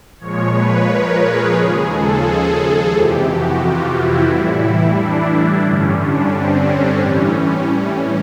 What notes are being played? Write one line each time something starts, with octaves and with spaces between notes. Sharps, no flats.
A#2 F3 G#3 C#5
B4
A#4
G#4
D#2 C#3 F3 G#3 G#4
A4
G#4
F2 C3 E3 G4
F#4
F4
E4
A2 E3 G3
D4
G2 D3 G3 C#4
D4
C4
C#4
A2 E3 G3 C#4
C#4
C#4